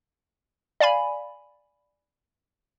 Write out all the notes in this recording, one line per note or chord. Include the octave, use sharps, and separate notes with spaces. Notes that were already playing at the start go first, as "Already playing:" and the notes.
D5 F5 G#5 B5